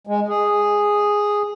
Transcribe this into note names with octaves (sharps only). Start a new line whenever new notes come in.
G#3
G#4